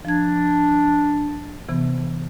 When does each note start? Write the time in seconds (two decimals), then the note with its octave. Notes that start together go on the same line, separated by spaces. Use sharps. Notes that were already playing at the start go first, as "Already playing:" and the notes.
0.05 F3 D4 G#6
1.69 C3 E3 B3